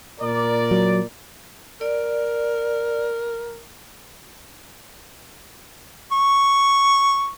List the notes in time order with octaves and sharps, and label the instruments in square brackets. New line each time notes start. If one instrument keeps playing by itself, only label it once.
[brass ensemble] A#2 A#4 D5
[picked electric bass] F#3
[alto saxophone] A#4 [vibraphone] D5
[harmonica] C#6